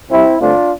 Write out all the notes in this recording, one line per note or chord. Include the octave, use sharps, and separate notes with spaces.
C2 C3 G3 C4 E4
G2 D3 A3 C4 D4 F4